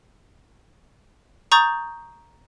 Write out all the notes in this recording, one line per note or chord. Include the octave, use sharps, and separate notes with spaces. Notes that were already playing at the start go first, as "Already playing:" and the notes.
A#5 C#6 D#6 G6 A6